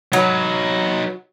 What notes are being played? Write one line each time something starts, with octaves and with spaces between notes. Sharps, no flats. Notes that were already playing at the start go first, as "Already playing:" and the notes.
F#3 D#4 B4